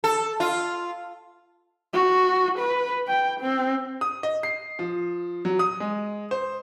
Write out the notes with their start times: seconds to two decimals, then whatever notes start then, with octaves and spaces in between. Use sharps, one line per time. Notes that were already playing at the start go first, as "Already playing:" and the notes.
0.04 A4
0.40 F4
1.94 F#4
2.59 B4
3.07 G5
3.41 C4
4.01 D#6
4.23 D#5
4.43 C7
4.79 F3
5.45 F#3
5.59 D#6
5.80 G#3
6.31 C5